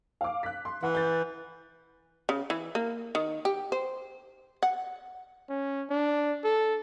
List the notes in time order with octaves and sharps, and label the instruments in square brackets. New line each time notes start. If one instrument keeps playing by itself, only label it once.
[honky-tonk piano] F5 D6
F#6 B6
C6
[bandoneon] E3 [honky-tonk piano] F#5
[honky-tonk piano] G6 A6
[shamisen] C#3
E3
A#3
D#3
G4
C5
F#5
[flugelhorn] C#4
D4
A4